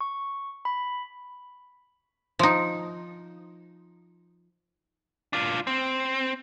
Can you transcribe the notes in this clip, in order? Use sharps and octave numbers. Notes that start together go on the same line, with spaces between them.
C#6
B5
F3 D#4
D4 F4
C4